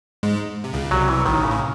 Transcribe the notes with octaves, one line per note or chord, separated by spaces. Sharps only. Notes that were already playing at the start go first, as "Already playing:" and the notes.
G#2 G#3
C3
C#2 C#3
C2 C3 F#3
E3
A1 A2 D#3
C#3
A2